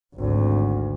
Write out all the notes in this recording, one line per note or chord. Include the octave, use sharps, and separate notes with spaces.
G#1 D2